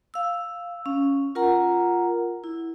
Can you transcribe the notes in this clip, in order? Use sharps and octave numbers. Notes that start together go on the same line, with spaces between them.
F5 E6
C#4
F4 A#4 F#5 A#5
E4